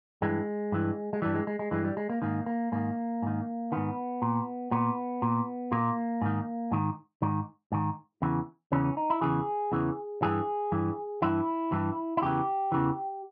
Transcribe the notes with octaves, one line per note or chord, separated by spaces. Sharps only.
G2 E3 G#3
G2 E3
G#3
G2 E3 G3
G#3
G#3
G#3
G2 E3 G#3
G3
G#3
A#3
G#2 D#3 A#3
A#3
G#2 D#3 A#3
G#2 D#3
G#2 D#3 B3
A#2
A#2 B3
A#2
A#2 A#3
G#2 D#3
G#2 D#3
G#2 D#3
G#2 D#3
E2 C#3 E3
E2 C#3 E3 C#4
C#4
D#4
E4
E2 C#3 E3 G#4
E2 C#3 E3
G2 E3 G#4
G2 E3
G2 E3 E4
G2 E3
E4
E2 C#3 E3 G4
E2 C#3 E3